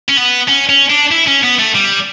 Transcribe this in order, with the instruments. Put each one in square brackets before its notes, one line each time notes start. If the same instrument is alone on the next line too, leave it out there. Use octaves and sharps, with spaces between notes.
[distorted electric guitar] C#4
B3
C#4
C#4
D4
E4
C#4
B3
A3
G3